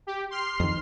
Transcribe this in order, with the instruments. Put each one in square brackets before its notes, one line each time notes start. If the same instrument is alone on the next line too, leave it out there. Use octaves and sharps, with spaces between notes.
[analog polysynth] G4
C6 F6 C7
[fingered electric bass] F2 D#3